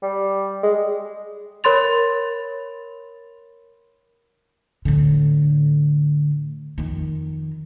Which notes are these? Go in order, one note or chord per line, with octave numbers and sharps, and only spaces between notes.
G3
G#3
A#4 C#5 B5 C6 A6 F7
A2 D3
F2 D#3